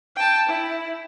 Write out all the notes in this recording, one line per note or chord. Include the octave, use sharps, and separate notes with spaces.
G5 A5
E4